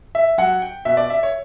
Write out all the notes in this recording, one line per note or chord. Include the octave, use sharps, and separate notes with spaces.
E5
F#3 F#5
G5
B2 E5
D5
E5
C#5